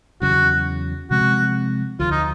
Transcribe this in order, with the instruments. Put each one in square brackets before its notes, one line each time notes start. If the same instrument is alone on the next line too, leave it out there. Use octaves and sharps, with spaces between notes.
[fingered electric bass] E2 C#3 F#3 [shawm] F#4
[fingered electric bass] C3 F3 G#3 C4 [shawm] F#4
[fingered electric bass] D2 D3 F3 [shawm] F4
[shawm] D#4